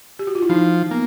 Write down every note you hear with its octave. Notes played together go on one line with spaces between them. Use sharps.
G4
F#4
F4
E4
F3 D#4
A#3 B3